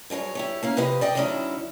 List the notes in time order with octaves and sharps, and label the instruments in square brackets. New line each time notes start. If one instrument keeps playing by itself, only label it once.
[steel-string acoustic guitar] G2 F#3 G#4 C#5
E4 G4 C#5
A#3 C#4 F5
F2 C3 G4 B4 D#5
D5 D#5 G5
D2 D3 F#3 C#4 D#4 E4